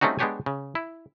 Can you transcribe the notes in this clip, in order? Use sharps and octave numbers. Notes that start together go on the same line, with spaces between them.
G3 A3 C4 C#4 D#4 F#4
G#3 B3 D4 G4 C#5 G#5
C#3
E4